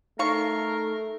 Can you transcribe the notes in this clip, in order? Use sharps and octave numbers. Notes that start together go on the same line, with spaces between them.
A3 D#4 A#4 F5 C#6 C7